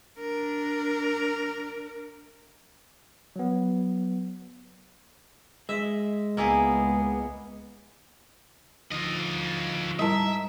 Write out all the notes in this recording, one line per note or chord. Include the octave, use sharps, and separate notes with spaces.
D4 A#4
F#3 B3
G#3 E5
C#2 A#3 B3 E4 G#4
D2 F3 D#4 F4 D#5
G#2 G3 E4 A#4 E5 A5